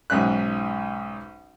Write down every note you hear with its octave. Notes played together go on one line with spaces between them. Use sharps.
B1 G#2 C#4 E5 F#6